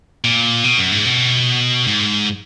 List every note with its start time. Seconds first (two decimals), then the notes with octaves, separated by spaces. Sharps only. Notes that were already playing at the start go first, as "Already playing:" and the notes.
0.24 A#2
0.64 B2
0.78 F#2
0.92 G#2
1.05 B2
1.87 G#2